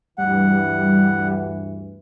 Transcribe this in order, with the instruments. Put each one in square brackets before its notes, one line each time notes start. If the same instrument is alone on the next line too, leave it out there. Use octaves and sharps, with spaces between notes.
[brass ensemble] D2 G2 E3 [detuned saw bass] G3 [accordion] F#5